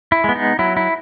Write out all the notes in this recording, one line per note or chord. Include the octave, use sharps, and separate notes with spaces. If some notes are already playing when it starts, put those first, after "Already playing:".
E4
G#3 B3
D#4
F#3 E4
E4